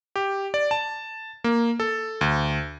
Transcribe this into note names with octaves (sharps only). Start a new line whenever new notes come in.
G4
D5
A5
A#3
A4
D2